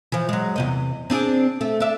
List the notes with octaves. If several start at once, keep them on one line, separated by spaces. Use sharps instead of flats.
E3 F3
F#3 G#3
E2 C3 D#5
C4 D4 G#4
A3
D4 E5